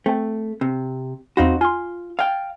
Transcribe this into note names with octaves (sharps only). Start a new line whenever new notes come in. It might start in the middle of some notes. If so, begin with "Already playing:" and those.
A3 C4 G5
C3
E2 C4 D#4 F#4 F5 B5
F4 G#5 C6
F5 G5 G#6 A6